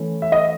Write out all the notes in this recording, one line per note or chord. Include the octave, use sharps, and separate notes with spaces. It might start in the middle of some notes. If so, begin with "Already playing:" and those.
Already playing: E3 A3 C#4
E5
D#5